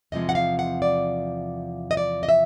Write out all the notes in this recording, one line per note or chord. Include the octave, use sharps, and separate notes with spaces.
E2 C3 F3 G#3 D#5
F#5
F5
F#5
D5
D#5
D5
D#5
E5